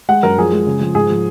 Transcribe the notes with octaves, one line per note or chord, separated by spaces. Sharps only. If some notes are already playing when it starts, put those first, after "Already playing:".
G#3 F#5
F#2 A#4
F3 G#4
G#3
C#3
F3
G#2 G#4
F3